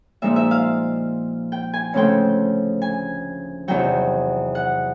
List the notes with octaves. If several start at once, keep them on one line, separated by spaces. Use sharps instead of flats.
A#2 F3 G#3 C4 D#4 E5
E5
F5
G5
G#5
D2 C#3 F3 A3 C4 G5
G#5
E2 C3 D#3 F#3 G5
F#5